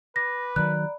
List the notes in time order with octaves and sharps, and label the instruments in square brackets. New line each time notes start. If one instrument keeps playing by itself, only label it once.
[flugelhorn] B4 [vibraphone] D6 [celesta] A#6
[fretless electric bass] D#3 F3 F#3 [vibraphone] D5 A#5 B5 [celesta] F#6